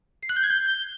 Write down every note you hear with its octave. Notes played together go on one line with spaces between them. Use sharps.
C7
F#6
G6
G#6
G6